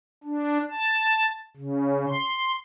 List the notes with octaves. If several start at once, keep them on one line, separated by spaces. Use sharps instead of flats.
D4
A5
C#3
C6